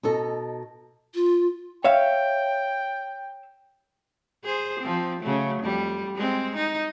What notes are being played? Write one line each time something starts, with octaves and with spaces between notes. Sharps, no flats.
B2 D#4 A4
F4
C#5 E5 F5 G5
G#4 C5
F3 C4
C#3 F#3 A3
F2 G3
G#3 C4
D#4